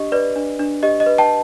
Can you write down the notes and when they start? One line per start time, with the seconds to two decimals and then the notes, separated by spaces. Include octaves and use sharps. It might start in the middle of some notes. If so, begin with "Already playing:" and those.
Already playing: D4 G4 D#5
0.12 B4 D5
0.36 D4
0.59 D4
0.83 G4 D#5
1.00 D#5
1.06 B4
1.18 G5 A5